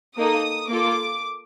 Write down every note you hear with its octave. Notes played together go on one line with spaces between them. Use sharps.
A#3 D#4 A4 D#6
A#3 F4 A4 D6